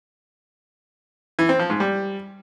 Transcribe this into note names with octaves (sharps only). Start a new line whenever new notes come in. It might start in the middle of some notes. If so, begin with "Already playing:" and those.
E3
C4
F3
G#2
G3